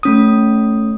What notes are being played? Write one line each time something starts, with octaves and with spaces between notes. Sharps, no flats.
A3 C#4 D#6